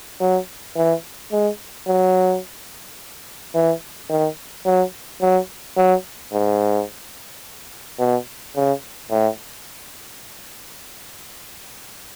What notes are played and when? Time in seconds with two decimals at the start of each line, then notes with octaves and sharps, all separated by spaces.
0.21 F#3
0.76 E3
1.32 G#3
1.88 F#3
3.55 E3
4.10 D#3
4.66 F#3
5.21 F#3
5.77 F#3
6.32 G#2
7.99 B2
8.56 C#3
9.11 A2